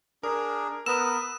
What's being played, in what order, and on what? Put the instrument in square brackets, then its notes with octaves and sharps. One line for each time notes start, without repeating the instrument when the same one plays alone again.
[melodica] D4 G#4 [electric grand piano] A#4
[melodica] B3 A#4 [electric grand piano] B4 D#6 E6 [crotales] E7